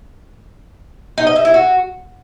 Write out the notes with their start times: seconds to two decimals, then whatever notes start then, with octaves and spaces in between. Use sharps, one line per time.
1.18 D#4
1.27 D#5
1.36 E5
1.45 E4
1.54 F#4